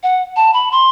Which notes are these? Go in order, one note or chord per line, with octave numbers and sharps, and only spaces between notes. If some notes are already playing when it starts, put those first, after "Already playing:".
F#5
A5
B5
C6